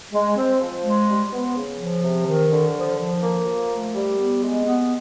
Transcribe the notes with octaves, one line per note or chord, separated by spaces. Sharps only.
G#3
C4
F3
G#3
G3
B3
C#3
F3
C3
D#3
D3
F3
F3
A#3
F3
A3
G3
B3
G#3
B3